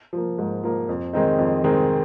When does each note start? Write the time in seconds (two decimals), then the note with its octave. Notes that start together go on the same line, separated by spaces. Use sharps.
0.13 F3 A#3
0.38 G#2
0.63 F3 A#3
0.89 F2
1.13 D#3 G#3 C4 D#4
1.39 F2
1.64 D#3 G#3 C4 D#4